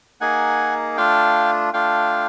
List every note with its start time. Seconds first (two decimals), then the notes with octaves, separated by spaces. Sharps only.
0.21 A#3 D#4 G#4 F#5 G#5
0.97 A3 D4 F4 F5 G5
1.74 A3 D4 F4 F5 G5